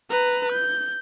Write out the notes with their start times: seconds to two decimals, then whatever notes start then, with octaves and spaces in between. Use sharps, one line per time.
0.11 B4 A#5
0.52 G6